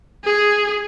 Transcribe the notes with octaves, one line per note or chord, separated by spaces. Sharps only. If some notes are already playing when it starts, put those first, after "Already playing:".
G#4